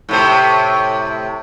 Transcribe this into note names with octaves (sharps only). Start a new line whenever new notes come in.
A2 C3 C5